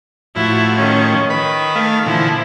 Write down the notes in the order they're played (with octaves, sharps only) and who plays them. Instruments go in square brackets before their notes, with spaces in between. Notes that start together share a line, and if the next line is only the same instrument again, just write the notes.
[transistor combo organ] A2 F3 [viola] E4 F#4
[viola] D#3 C#4
[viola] D#3 [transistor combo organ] B4 B5
[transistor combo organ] A3 F5
[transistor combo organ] A#2 D3 E3 [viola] F3 E4